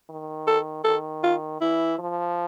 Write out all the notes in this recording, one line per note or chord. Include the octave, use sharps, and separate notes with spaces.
D#3
A4
D#3 A4
F4
E3 E4
F3